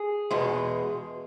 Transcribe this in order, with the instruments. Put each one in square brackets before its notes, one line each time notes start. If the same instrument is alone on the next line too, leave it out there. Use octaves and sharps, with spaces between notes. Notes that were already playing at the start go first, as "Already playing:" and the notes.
Already playing: [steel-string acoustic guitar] G#4
E2 B2 G#3